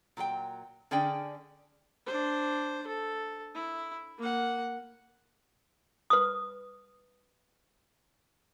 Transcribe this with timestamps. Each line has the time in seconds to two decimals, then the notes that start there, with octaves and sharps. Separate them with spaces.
0.17 A#2 F#3 A4 G5
0.91 D3 C#4 G#4 D5 G5
2.06 D4 C5
2.87 A4
3.55 E4
4.18 A#3 F#5
6.10 B4 D#6